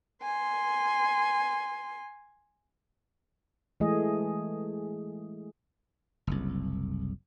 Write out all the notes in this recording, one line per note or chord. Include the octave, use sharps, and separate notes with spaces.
G#5 C6
E3 G#3 A3 G#4 D#5
F#1 C2